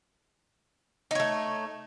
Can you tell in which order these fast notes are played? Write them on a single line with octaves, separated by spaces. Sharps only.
D#4 C#5 A3